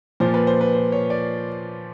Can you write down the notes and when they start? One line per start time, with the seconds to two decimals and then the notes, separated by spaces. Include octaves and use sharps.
0.20 A#2 F3 C5
0.34 B4
0.47 C5
0.61 B4
0.75 C5
0.92 C#5
1.10 D5